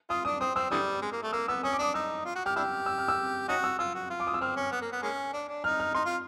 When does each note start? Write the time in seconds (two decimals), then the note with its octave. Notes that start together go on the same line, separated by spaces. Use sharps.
0.10 F4 D#6
0.25 D4 D#6
0.40 C4 D#6
0.56 C4 E6
0.71 D3 E3 G3 D#6
1.02 G#3
1.12 A#3
1.23 A3
1.33 A#3 E6
1.48 B3 E6
1.63 C#4 D#6
1.73 D6
1.79 D4 D#6
1.94 D#4 E6
2.25 F4
2.36 F#4
2.46 G4 F6
2.56 D4 E4 G4 E6
2.86 E6
2.98 F6
3.08 E6
3.48 C#4 D#4 F#4 D#6
3.64 E6
3.79 F4 E6
3.94 F#4
4.10 F4
4.20 D6
4.27 D#6
4.34 E6
4.41 C4 F6
4.56 C#4
4.72 B3
4.81 A#3
4.92 B3
5.03 G#3 A#3 C#4
5.33 D4
5.49 D4
5.64 D#4 F6
5.79 F6
5.94 D#4 C6
6.05 F4